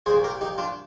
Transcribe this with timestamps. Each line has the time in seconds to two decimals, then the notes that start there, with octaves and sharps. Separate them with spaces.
0.06 A#2 G#4 C5
0.11 C2
0.24 G4 A#4
0.41 D#4 G4
0.58 D4 F4